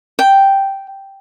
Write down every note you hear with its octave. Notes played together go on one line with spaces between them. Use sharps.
G5